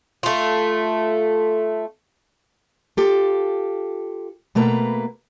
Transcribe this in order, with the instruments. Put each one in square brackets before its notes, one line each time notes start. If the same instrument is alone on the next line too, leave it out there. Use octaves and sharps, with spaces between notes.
[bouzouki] A3 F4
[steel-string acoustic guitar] F4 G4 A4
B2 A3 A#3 B4 A#5